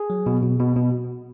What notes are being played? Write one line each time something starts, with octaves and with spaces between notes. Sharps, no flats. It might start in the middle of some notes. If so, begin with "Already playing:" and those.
Already playing: G#4
F#3
B2
B2
B2
B2